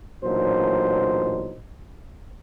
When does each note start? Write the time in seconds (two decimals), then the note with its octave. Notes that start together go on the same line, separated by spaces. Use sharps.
0.24 A1 A#2 F#3 D4 D#4 C5